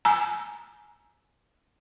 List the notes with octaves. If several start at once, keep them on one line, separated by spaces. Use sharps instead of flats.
G#5 A#5